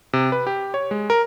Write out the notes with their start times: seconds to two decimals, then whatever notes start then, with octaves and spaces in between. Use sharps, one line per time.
0.13 C3
0.32 B4
0.47 G4
0.74 C#5
0.91 G#3
1.10 A#4